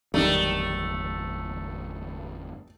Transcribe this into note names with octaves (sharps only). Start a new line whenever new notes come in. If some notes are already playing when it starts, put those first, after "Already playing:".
G1 E2 D#3 F#3 G3 A3